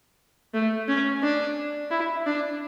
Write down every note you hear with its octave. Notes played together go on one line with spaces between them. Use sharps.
A3
C#4
D4
E4
D4